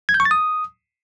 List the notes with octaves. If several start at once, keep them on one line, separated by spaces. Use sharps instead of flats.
G#6
G6
C#6
A6
D#6